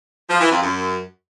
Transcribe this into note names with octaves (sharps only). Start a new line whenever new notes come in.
F3
E3
F2
F#2